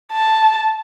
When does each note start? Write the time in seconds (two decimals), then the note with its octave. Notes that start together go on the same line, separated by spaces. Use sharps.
0.12 A5